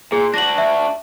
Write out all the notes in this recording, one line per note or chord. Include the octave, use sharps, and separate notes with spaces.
A#2 G#4
D4 F#4 A#6 F#7
E5